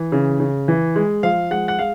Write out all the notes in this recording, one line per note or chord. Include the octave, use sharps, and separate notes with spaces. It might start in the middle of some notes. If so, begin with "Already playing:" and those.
Already playing: E3
C#3
C#3
E3
G#3
F3 F5
G#3 F#5
F#5
G#3 F5